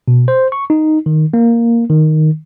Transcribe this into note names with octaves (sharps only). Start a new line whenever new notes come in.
B2
C5
C#6
D#4
D#3
A#3
D#3